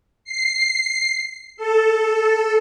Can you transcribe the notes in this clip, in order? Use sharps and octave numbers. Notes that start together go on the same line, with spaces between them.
C7
A4